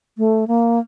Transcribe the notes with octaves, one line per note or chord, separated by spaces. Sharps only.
A3
A#3